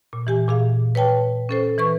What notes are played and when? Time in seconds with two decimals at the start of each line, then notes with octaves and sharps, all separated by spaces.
0.13 A#2
0.27 E3 G4 G#5
0.48 A#2 G#4 F5
0.95 B4 C#5 G5 A5
1.49 C#4 A4 C5
1.78 E3 B4 C#6